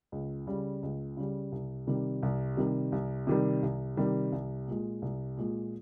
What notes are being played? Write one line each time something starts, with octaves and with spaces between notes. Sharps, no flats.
C#2
C#3 G3
C#2
C#3 G3
C2
C3 D#3 G3
C2
C3 D#3 G3
C2
C3 D#3 G3
C2
C3 D#3 G3
C2
A#2 G#3
C2
A#2 G#3